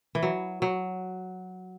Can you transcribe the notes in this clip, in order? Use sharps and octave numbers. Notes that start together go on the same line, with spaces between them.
E3
F#3
F#3